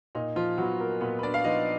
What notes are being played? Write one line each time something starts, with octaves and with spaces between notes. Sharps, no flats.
A#2 D#4
F3 F4
F3 F#3 B3 F#4
A#3 A#4
A#2 B3 B4
B4
D4 D5
F5
F3 B3 D#4 D#5